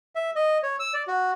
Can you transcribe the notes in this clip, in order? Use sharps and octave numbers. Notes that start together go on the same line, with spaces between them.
E5
D#5
C#5
E6
D5
F#4